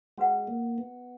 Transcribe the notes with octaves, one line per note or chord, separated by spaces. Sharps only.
G#3 C#4 F#4 B4 F#5
A#3
B3